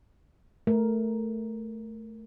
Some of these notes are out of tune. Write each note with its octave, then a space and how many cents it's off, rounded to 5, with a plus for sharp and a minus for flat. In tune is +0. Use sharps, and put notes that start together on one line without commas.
A3 +0 A#4 +0